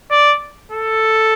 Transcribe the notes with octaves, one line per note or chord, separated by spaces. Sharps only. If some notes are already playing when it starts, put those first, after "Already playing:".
D5
A4